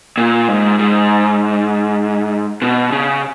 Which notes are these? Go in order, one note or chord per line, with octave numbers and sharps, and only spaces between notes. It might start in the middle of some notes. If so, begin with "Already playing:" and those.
A#2
G#2
G#2
B2
C#3